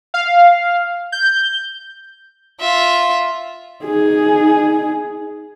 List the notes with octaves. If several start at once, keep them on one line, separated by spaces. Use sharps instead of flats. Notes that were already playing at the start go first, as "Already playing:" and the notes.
F5
G6
F4 E5
D#4 G#4